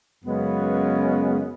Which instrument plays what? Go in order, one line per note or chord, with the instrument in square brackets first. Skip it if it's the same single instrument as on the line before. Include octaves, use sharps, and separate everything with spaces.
[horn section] F#2 C#3 G#3 B3